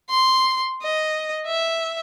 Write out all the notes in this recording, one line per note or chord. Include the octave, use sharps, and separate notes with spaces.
C6
D#5
E5